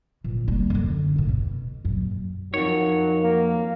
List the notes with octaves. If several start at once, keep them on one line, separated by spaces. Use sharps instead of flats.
A#2 E3
G3 A#3
F#2 D3
D#2 A2
B2
F#2 A#2
F2 D#3 F#3 C#5
A#3